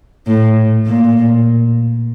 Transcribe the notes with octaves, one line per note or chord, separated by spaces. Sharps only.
A2
A#2